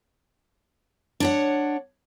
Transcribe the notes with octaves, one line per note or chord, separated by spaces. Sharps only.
D4 C#5 F#5